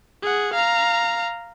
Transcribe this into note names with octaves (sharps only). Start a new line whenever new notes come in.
G#4 F#5
F5 A#5